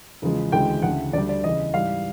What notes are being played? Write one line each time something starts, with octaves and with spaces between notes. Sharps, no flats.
E2 C#3 F3 G#3
D2 C#3 E3 G#3 G5
D2 C#3 E3 F#5
D2 D3 G3 D5
D5
E2 C#3 E3 D#5
G#2 E3 G3 F5